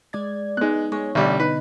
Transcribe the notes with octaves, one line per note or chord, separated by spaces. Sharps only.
G#3 D5 G#6
G#3 B3 D#4 F#6
G#3 C#5
A1 B2 D3 G3
D#4 B4